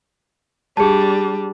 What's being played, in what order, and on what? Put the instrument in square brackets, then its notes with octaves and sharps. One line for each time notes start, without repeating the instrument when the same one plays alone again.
[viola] G3 D4 [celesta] G#4 A5